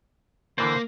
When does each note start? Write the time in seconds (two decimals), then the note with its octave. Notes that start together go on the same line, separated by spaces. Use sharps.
0.58 D3 E3 A#3 C5 D5